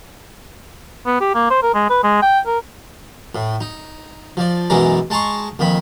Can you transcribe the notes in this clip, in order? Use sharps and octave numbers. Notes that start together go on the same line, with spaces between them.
B3
G4
A#3
C5
A#4
G#3
B4
G#3
G5
A#4
A2
D#4
F3 D5
B1 F#2 E3 G#3 D5 A#5
G#3 A5 A#5 C6 C#6
F2 A#2 D#3 B5